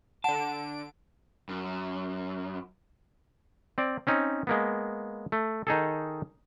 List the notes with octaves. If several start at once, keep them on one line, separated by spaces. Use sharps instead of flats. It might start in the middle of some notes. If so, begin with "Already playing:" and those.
D3 F#5 A5 D7
F#2
C4 D5
C4 C#4 D#4
G#3 A#3 B3
A3
D#3 D#4 G#4 A4